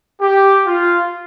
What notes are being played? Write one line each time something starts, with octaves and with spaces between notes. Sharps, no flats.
G4
F4